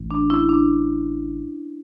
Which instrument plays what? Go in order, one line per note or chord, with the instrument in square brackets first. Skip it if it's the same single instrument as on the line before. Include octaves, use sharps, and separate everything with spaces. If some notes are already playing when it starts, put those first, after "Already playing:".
Already playing: [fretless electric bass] A1
[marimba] D4
C#4 E4
D4